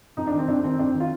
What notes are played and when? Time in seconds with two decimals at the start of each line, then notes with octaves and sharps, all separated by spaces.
0.17 F2 D#4
0.27 D4
0.33 D#3
0.39 C4
0.48 F2 D4
0.64 D#3 C4
0.79 F2 D4
0.95 D#3
1.00 F4